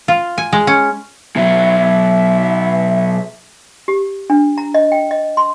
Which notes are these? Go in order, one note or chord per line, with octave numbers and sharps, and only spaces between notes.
F4
G#5
G#3
C#4
B2 F#3 E5
G4
D4
A#5
D#5
G5
D#5
C6